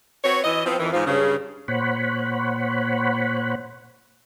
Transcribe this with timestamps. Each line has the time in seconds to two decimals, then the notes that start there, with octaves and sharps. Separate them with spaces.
0.24 C4 F#4 B4 C#5
0.44 E3 D#5
0.66 F3 B3 C4
0.78 F2 D#3 E3
0.93 G#2 E3 F3
1.06 G2 C#3
1.68 A#2 C5 C#5 F#5 B5